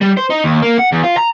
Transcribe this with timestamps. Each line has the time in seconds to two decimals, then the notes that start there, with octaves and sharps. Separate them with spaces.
0.01 G3
0.17 C5
0.30 D#4
0.44 D#2
0.62 A#3
0.78 F#5
0.92 E2
1.03 F4
1.17 A#5